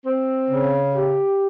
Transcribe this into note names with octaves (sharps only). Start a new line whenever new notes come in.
C4
C#3
G4